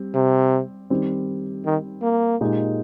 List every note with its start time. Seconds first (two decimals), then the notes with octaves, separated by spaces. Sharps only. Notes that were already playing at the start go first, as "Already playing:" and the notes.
Already playing: G3 C4
0.15 C3
0.90 D#3 G3 C4
1.66 D#3
2.02 A#3
2.41 A#2 G#3 D#4 G4